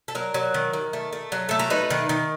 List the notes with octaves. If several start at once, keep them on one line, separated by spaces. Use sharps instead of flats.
A4
F#3 A#4
F#3
D#3
D#3
A3
A3
F#3
A3 A4
A#4
D#4 B4
D#3
D#3